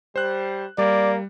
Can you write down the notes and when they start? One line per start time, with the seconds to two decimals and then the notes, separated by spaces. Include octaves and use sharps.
0.16 G3 C5 F#6
0.78 G3 A#3 D5